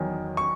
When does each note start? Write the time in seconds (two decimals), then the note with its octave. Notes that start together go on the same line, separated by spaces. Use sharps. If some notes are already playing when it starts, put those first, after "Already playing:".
Already playing: E2 D#3 F#3
0.37 C#6